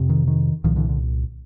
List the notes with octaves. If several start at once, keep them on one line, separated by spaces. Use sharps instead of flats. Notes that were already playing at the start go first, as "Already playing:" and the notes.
Already playing: F2 C3
D#3
D#3
C2 A#2 D#3 F3
D3 E3
D3